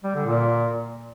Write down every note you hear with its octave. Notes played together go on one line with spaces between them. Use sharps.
G3
D3
A#2